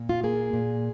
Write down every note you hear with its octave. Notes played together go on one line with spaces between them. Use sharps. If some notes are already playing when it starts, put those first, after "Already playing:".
Already playing: A#2
F4
A#3 G#4
A#2